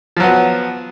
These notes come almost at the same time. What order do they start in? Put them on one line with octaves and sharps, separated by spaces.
F3 F#3 B3